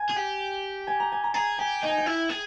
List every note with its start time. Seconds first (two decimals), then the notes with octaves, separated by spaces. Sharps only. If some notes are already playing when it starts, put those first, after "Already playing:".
Already playing: G#5
0.09 G#4
0.16 G4
0.87 G#5
1.00 A#5
1.12 G#5
1.24 A#5
1.34 G#4 A#5
1.58 G4 G#5
1.82 D#4 G5
1.89 G#5
1.98 G5
2.06 E4
2.29 G#4